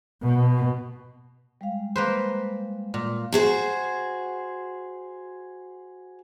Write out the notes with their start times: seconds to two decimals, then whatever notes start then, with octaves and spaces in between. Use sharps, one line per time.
0.23 B2
1.61 G3 G#3 F5
1.96 A#3 B4 C5
2.94 A#2
3.33 F#4 G#4 C5